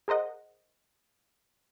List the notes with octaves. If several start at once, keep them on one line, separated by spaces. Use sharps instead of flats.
G#4 A#4 C5 D#5 F#5